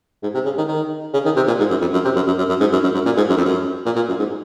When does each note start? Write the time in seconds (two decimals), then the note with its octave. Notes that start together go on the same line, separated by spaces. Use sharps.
0.23 G#2
0.34 C3
0.45 C#3
0.58 D#3
0.68 D#3
1.13 C#3
1.25 D#3
1.36 C3
1.47 A#2
1.59 G#2
1.70 F#2
1.81 F2
1.93 F#2
2.05 C3
2.16 F#2
2.27 F#2
2.38 F#2
2.49 F#2
2.60 G#2
2.72 F#2
2.84 F#2
2.94 F#2
3.05 A#2
3.17 G#2
3.29 F#2
3.37 F2
3.46 F#2
3.86 A#2
3.96 A#2
4.08 F#2
4.19 G#2